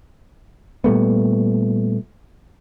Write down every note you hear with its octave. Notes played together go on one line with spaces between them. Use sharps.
A#2 G3 A3 B3